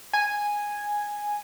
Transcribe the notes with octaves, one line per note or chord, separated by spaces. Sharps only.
G#5